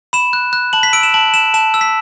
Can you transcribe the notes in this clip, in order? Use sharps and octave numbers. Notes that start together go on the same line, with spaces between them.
B5 E7
F#6
F#6
A5 F#7
B6
E6 D7
E7
A5 F#7
A5 E7
A5 E7
E6
B6